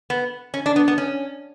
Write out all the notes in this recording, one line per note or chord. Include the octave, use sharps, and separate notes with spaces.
B3
C#4
D4
B3
B3
C#4